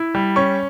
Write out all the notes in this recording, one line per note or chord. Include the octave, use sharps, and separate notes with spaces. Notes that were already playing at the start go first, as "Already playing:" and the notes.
Already playing: E4
G3
C#4 C#6